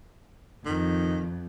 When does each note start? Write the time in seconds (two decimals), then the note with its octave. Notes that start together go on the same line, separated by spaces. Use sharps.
0.66 F2 D#3